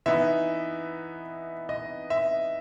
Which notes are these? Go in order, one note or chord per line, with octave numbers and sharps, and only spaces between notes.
E3 B3 D#4 E5
D#5
E5